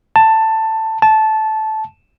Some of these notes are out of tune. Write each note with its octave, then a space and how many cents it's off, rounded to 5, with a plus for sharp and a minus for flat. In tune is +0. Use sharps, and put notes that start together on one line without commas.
A5 +10
A5 -15